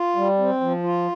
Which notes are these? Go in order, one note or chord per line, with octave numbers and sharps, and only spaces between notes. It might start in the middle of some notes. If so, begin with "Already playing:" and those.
Already playing: F4
G3
C4
F3
F4